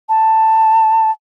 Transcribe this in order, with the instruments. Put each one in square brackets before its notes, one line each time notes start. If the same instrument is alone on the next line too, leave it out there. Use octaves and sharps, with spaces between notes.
[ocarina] A5